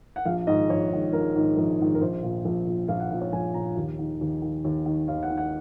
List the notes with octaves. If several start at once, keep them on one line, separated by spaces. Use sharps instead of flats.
F#5
A#1 F5
G#2 D#3 D#5
A#1 C#5
G#2 D#3
A#1 A#4
G#2 D#3
A#1
G#2 D#3
A#4
A#1 C5
A#2
A#1
A#2
A#1 F5
F#5
A#2 F5
C#5
A#1 G#5
A#2 A#5
D#2
D#3
D#2
D#3
D#2
D#3
D#2 F5
F#5
D#3
F#5